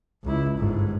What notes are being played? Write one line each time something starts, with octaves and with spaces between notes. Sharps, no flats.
C#2 E4
G1 G#2